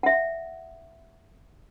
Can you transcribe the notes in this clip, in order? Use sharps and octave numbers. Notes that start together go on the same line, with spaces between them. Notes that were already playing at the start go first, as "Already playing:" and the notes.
E5 F#5